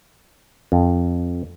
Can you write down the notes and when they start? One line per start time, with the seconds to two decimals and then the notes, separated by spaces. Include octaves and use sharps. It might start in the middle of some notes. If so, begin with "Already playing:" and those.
0.72 F2